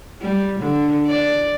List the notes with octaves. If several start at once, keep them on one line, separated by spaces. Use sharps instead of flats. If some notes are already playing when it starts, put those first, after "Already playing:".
G3
D3
D5